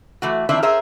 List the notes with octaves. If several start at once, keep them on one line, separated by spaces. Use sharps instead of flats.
E3 A3 F#4
D#3 F3 C4 D4 E4 E5
G#4 A#4 C5 E5